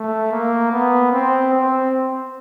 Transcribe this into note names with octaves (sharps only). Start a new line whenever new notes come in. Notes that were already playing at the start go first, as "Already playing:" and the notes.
Already playing: A3
A#3
B3
C4
C4